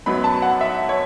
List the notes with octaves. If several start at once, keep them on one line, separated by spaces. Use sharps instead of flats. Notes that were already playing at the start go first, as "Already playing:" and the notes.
F#2 F#3 B3 B5
A5
F#5
E5
C#5